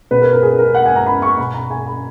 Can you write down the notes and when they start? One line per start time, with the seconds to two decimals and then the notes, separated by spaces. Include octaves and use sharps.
0.11 B2 B4
0.22 A#4
0.33 A#4
0.43 G#4
0.59 A#4
0.74 F#5
0.86 G#5
0.96 A#5
1.06 B5
1.22 C#6
1.38 B2 B5
1.54 A#5
1.71 G#5
1.86 B5